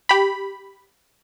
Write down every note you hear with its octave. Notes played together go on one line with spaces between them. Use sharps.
G4 B5